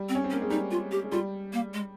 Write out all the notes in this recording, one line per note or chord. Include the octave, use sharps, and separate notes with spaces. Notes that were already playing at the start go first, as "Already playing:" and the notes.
Already playing: G3
C4
C#4
C4
C#4
A#3
G#3
G3 D#4
F4
G4
G#3
G3 F4
A#3
G#3